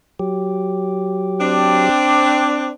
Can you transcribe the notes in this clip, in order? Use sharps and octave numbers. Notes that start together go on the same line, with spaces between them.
F#3 G4
C4 D4